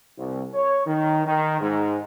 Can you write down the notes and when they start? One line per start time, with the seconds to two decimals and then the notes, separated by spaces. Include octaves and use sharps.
0.18 C2
0.54 C#5
0.86 D#3
1.26 D#3
1.60 G#2